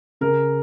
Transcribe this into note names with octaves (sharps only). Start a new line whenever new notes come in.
C#3 A#4